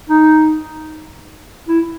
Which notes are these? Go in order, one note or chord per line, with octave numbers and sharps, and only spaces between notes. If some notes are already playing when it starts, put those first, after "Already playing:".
D#4
E4